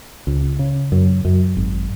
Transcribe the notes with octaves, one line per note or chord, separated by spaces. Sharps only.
C#2
C#3
F#2
F#2
G#1